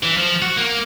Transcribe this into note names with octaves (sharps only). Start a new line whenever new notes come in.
E3
F3
F#4
A#3